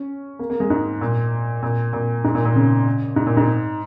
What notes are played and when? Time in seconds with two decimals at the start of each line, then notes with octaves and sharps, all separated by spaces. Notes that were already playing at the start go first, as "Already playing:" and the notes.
Already playing: C#4
0.39 A#3
0.50 A#3
0.60 G#3
0.70 G#2
1.01 A#2
1.63 A#2
1.93 A#2
2.24 G#2
2.35 A#2
2.45 A#2
2.55 C#3
3.16 G#2
3.27 A#2
3.37 G#2